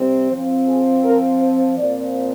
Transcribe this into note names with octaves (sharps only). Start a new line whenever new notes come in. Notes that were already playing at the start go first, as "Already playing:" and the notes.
Already playing: C3 G3 C4
F3 C4 C5
G#4
A#4
C5
A#2 F3 C4 D5